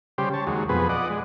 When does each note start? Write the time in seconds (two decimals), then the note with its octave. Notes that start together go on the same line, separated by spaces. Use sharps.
0.18 C#3 G3 G4 C5
0.34 C#5 A5
0.47 D#2 F#3 G#3
0.69 F2 B2 G#4 B4
0.89 D5 D#5 F#5
1.10 G#3